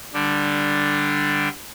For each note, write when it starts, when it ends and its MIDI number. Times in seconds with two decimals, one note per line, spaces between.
0.13 1.49 50
0.13 1.49 55
0.13 1.49 62